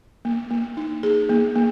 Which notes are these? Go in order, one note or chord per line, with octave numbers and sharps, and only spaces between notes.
A#3
A#3
D#4
G#4
A#3
A#3